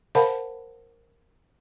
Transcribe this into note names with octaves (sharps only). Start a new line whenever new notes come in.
A#4 C5 F5 F#5 A5 B5